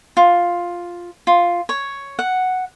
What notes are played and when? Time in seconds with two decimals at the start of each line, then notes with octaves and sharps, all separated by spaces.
0.17 F4
1.27 F4
1.69 C#5
2.19 F#5